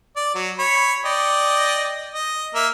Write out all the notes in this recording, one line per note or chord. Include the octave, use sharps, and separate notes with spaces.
D5
F#3
C#5 B5
D5 D#5 G5
D#5
A#3 E5